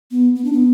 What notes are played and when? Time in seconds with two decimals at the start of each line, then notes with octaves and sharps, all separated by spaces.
0.11 B3
0.35 B3
0.45 D4
0.53 B3